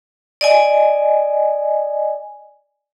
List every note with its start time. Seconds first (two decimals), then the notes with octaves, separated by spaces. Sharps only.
0.41 D5 D#5 G#5